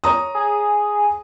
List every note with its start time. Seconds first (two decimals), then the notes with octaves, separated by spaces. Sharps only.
0.04 C#5 A#5 D#6
0.35 G#4